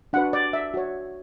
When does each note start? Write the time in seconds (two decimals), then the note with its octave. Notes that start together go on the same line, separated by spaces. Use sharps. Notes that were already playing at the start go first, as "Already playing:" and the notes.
0.13 D4 F#4 B4 F#5
0.33 D5
0.53 E5
0.74 F#4 C#5